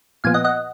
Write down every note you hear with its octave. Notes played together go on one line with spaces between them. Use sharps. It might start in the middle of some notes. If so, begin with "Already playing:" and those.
A#2 F3 B3 F5 G#5
D#5 F#5
D#5 F#5